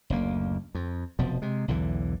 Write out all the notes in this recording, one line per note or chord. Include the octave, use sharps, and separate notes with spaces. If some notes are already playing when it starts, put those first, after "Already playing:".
F#1 D2 A#3
F2
F1 B2 F3
C3 G#3
B1 E2 D3 E3